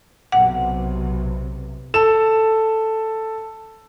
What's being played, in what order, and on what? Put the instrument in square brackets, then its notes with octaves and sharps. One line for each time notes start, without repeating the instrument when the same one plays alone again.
[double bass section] B1 C3 [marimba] F#5
[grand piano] A4 E7